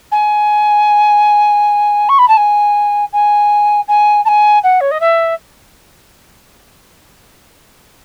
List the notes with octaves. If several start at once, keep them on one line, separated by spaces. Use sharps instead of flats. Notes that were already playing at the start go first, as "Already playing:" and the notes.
G#5
C#6
B5
A5
G#5
G#5
G#5
A5
G#5
F#5
C#5
D#5
E5